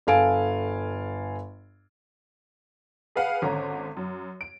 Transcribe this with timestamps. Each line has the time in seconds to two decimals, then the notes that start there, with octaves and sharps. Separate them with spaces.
0.07 G1 A4 F5 G#5 D7
3.15 G#4 B4 F5 F#5
3.42 G#1 D3 C#4 A#5
3.97 F#2
4.41 D7